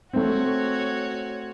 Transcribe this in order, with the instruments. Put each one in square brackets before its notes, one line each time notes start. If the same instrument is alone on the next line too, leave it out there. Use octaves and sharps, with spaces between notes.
[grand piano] A3 C4 [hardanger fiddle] F#4 C#5